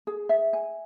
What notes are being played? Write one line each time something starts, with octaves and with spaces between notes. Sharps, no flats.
G#4
E5
G#5